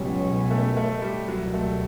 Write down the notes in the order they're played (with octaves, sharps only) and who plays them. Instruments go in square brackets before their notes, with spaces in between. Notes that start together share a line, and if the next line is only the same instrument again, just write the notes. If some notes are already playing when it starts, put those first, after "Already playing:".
Already playing: [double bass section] C#2 B2 F#3 C#4 [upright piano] G3
[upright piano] A3
A3
G3
[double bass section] C#2 B2 G3 [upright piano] F#3
[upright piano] A3